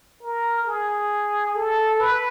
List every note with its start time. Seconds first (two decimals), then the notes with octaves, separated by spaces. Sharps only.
0.23 A#4
0.66 G#4
1.55 A4
2.00 B4